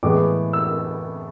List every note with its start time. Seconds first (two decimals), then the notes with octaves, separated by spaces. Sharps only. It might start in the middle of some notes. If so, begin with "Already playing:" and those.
0.03 A2 E3 G#3 B3 D6
0.53 E6